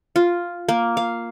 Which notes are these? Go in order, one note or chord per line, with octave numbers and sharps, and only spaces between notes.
F4
A#3
F5